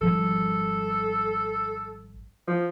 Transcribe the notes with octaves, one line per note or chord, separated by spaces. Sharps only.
G#1 F3 G3 A4
F3